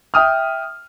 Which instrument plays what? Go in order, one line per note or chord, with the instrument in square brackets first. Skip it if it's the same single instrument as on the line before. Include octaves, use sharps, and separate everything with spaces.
[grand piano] E5 G5 D#6 F6